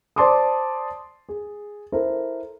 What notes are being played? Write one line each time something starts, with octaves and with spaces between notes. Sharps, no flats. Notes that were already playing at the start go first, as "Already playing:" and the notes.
C5 D5 A5 C6 D6 D#6
G#4
E4 A4 A#4 C5